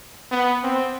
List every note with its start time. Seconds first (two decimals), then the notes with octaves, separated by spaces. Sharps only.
0.31 B3
0.63 C4